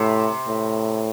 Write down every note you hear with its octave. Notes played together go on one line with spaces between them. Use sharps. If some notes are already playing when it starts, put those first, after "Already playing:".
Already playing: A2 C3
A2